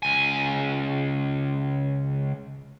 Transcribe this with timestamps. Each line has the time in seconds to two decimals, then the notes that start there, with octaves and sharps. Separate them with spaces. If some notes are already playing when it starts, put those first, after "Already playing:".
0.03 C#2 G#5